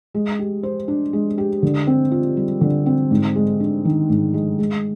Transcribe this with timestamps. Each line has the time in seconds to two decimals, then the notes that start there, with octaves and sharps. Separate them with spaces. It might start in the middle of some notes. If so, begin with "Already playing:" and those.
0.14 G#3
0.39 G4
0.63 C5
0.88 D4
1.13 G#3
1.38 G4
1.63 D3
1.87 C4
2.12 F4
2.37 G3
2.61 D3
2.86 C4
3.11 G#2
3.36 G#3
3.60 D4
3.85 D#3
4.09 G#2
4.34 G#3
4.59 G#3